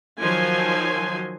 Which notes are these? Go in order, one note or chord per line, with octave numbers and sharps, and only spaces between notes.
D#3 F3 F#3 G#5 C6